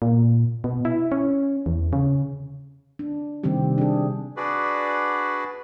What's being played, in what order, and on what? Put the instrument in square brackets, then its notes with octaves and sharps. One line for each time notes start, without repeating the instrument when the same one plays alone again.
[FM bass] A#2
B2
E4
C#4
E2
C#3
[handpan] D4
C3 D#3 G3 C4 G4
D4 G#4
[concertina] D4 F#4 G#4 B4 D5